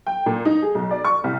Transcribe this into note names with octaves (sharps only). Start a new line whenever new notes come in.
G5
A#2
D#4
G#4
B1
D5
C#6
C2